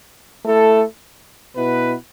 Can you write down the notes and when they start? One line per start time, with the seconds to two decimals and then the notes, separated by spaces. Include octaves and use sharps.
0.45 A3 E4 A4
1.56 B2 B3 E4 B4